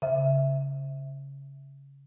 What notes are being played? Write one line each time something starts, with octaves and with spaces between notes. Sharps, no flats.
C#3 E5